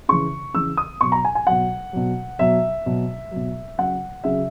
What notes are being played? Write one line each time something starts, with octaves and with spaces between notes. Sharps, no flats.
C#3 E3 C#6
C#3 E3 E6
D#6
B2 F#3 C#6
A#5
G#5
G#5
B2 F#3 F#5
B2 F#3
B2 F#3 E5
B2 F#3
B2 F#3
C#3 F#3 F#5
C#3 F#3 E5